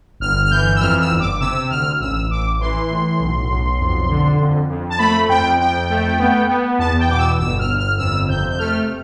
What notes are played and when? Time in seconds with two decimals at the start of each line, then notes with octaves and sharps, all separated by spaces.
0.20 G1 F6
0.45 F6
0.51 E3 G6
0.76 E6
0.81 F2 F6
1.01 E6
1.11 G1
1.20 D6
1.40 C3 E6
1.70 D2 F6
2.00 A1 E6
2.29 A1 D6
2.60 E3 C6
2.90 A2
3.20 B1
3.49 B1
3.79 F2
4.09 D3
4.40 F2
4.70 F2
4.90 A5
4.99 A3 B5
5.29 F2 G5
5.59 F2 G5
5.90 A3
6.19 B3
6.49 B3
6.79 E2 A5
6.99 G5
7.08 B2 D6
7.18 E6
7.38 G1 E6
7.59 F6
7.69 G1
7.78 F6
7.98 F2 E6
8.28 C3 G6
8.50 G6
8.59 A3 F6